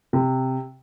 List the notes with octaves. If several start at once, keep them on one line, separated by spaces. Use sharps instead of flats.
C3